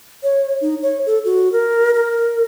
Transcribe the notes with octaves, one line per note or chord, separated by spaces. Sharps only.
C#5
D#4
C#5
A4
F#4
A#4
A#4